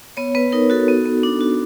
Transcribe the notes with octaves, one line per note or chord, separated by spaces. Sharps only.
B3 C#5
B3 B4
D#4 A#4
F#4 A4
B3
B3
D4
F#4